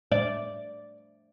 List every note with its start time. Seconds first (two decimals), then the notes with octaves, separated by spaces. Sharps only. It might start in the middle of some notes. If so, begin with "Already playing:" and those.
0.12 D5